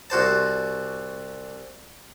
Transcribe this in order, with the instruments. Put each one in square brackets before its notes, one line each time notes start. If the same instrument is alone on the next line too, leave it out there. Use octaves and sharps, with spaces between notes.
[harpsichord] C2 F#4 C5 A5